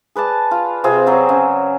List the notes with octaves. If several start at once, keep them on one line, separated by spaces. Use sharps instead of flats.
G#4 B4 D5 A5
F4
C3 C4 F4 G#4
F#3 C4 G#4
C#3